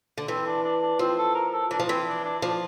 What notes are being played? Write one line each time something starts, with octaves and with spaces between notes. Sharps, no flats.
D3
E3 C4
D4
D4
D4
F3 C4
A4
A#4
A4
E3 D4
F3
E3 C4
D4
D4
F3 D4